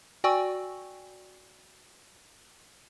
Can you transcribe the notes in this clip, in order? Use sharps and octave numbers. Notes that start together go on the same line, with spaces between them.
F#4 D5 G5 G#5 C#6 E6